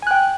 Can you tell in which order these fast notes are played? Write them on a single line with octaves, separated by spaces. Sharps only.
G#5 F#6 G5